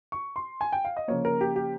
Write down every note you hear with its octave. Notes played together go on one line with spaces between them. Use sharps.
C#6
C6
G#5
G5
F5
D#5
C#3 F3 A#3 C#5
A#4
G4
G4